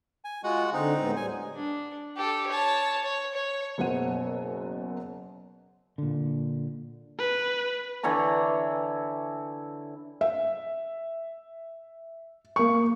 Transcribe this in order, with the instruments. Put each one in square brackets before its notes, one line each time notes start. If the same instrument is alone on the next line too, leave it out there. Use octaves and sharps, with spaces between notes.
[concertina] G#5
[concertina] G#3 F#4 F#5 [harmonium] F4
[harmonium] D3 [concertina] C4 D#4
[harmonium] A2 G#3 B3
[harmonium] D2 G3 [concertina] G#5
[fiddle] D4
G4 A4
C#5 A5
C#5
C#5
[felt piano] F#1 F#2 B2 C5 F#5 D#7
[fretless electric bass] A#2 D3
[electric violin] B4
[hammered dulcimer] D3 E3 C#5 A#5
[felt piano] E5
A#3 C#6